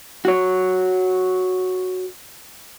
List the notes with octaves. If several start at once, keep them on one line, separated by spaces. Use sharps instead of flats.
F#4 C#5